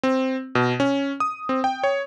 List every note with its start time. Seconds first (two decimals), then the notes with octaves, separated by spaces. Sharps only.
0.03 C4
0.55 B2
0.80 C#4
1.20 D#6
1.49 C4
1.64 G5
1.84 C#5